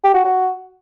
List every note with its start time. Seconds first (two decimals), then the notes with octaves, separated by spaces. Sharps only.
0.04 G4
0.14 F#4
0.25 F#4